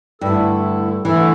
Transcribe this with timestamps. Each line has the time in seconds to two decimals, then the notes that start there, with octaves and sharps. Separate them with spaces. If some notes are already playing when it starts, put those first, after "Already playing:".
0.21 G2 D3 A3 E4 A4
1.05 D3 E3 A3 E4 A4